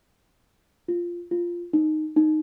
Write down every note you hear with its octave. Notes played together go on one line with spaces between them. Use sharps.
F4
F4
D#4
D#4